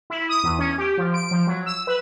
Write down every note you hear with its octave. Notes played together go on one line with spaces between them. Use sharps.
E4
D#6
E2
C#4
G4
F3
D7
F3
F#3
E6
B4